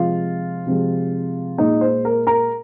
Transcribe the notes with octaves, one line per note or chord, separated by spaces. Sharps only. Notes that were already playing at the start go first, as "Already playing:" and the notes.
Already playing: C3 F3 G#3 F4 F5
C3 F3 G#3
A#2 G#3 D#4 D#5
C5
A#4
A#4 A#5